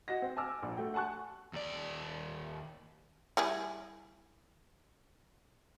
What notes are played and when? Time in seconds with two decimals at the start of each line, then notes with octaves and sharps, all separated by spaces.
0.08 F#4 D#5 A#6
0.22 C4
0.37 G#5 A5 D6 E6 F6
0.63 A#1
0.77 A3 F#4 G5
0.94 F#5 G#5 A5 C#6 F#6
1.53 D#2 D5
3.37 G3 E4 G#4